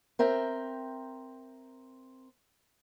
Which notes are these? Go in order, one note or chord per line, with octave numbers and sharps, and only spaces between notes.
C4 A#4 E5 G5